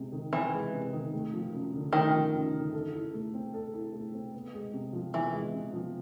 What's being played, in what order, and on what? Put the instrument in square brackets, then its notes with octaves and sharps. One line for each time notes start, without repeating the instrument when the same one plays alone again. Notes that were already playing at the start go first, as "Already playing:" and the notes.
Already playing: [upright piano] C3 G#3 C4
D#3
[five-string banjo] E3 [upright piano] C4
[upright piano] G#3
C3
D#3
A3
F3
F#2
D3
[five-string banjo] D#3 [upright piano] A3
[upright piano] F3
F#2
D3
A4
E4
A3
C4
A4
E4
A3
C4
B3
G#3
C3
F3
[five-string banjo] E3 [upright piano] B3
[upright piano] G#3
C3
F3